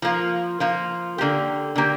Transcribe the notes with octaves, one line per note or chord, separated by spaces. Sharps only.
F3 A#3 F4
F3 A#3 F4
D3 A#3 G4
D3 A#3 G4